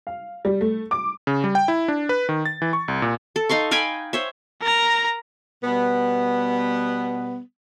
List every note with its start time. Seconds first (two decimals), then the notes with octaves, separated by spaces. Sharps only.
0.07 F5
0.45 G3
0.61 A3
0.91 D6
1.27 C#3
1.44 G3
1.55 G5
1.68 E4
1.88 D4
2.09 B4
2.29 D#3
2.46 A6
2.62 E3
2.73 C#6
2.88 C2
3.02 A#2
3.36 A4
3.49 D#4 F5 C6 C#6
3.71 F5 G5 G#5 B5
4.13 C5 C#5 E5
4.62 A#4 A#5
5.63 B2 G3 B3